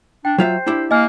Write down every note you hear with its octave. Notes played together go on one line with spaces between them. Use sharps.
D4 G5
F#3 F4 C5 E5
D4 E4 G4
A#3 D#5 G#5 F6